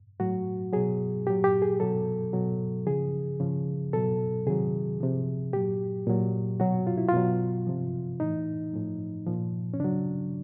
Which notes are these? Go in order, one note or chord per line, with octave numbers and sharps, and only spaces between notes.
A2 F#3 F#4
B2 F#3 G#4
A#2 F#3 G4
G4
G#4
B2 F#3 A4
B2 F#3
C#3 F3 G#4
C#3 F3
B2 F#3 A4
C3 D#3 F#3 G#4
C3 F3
A#2 F#3 G4
A#2 F#3
B2 F#3 F#4
F4
E4
F4
B2 F#3
C3 F3
A2 E3 D#4
A2 F3
A#2 F3
C#4
C#3 F#3 D4